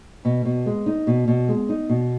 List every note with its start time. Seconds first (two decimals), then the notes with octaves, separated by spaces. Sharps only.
0.25 B2
0.45 B2
0.66 G#3
0.86 D#4
1.07 B2
1.28 B2
1.48 G#3
1.69 D#4
1.89 B2